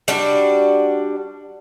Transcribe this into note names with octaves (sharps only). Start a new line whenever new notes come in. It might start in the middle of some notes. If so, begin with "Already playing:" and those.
G3 D4 F#4